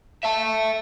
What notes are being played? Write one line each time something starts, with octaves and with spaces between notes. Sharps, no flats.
E5 A5